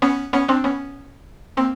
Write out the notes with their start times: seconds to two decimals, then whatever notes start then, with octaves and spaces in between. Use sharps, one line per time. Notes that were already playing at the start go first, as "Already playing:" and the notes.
0.02 B3 C#4
0.33 B3 C#4
0.48 C4 D4
0.64 B3 C#4
1.57 A#3 C4